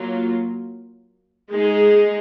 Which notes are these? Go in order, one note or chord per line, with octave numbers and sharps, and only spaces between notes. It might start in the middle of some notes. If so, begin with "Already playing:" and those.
Already playing: F#3 A#3 F4
G#3 D#4 G#4